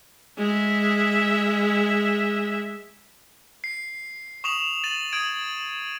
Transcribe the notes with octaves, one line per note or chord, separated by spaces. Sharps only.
G#3 E5
C7
C#6 D#6 E7 F7
A6 D#7 F#7
D#6 G#6 D7